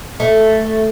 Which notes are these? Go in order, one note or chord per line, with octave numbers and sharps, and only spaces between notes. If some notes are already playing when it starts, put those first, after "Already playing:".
A3